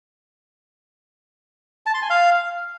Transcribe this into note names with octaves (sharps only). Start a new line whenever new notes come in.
A5
C6
G#5
F5